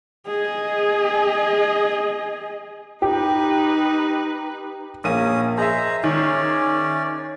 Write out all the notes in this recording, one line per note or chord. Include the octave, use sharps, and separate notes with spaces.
G#4 D#5
D#4 G4 B4
A#1 A#3 C#4 D#6 D#7
G#4 C5 D#5 E5 A#5
D#3 C#4 D5